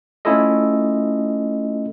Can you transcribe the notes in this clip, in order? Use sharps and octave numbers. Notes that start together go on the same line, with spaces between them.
A3 C#4 E4 F4 A4 D#5